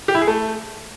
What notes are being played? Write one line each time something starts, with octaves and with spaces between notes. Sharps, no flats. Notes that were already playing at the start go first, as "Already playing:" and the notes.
G4
E4
G#4
A3